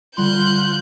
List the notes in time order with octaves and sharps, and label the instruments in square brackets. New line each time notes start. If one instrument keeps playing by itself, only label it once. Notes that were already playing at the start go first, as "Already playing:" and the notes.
[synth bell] D3 G3 C6 [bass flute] F4 [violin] F#6 G6